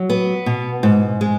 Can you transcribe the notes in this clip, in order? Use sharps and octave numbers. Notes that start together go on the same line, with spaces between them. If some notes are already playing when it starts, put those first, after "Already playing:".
Already playing: F#3
B3
B2
G#2
G#3